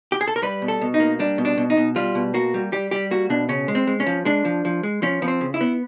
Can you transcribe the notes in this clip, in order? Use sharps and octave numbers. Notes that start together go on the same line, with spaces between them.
G4
G#4
A4
A#4
G3 B4
B2
A4
B2
D#4
A#3
G3 D4
B2
D4
B2
D#4
B2
G3 F4
B2
A#3 F#4
G3
G3 G4
G3 G4
A#3 F#4
B2 D4
C#3 C#4
G#3
C4
G#3
C#4
F3
G#3 D4
F3
F3
G#3
F3 C#4
F3 B3
C4
C#3
E4
B3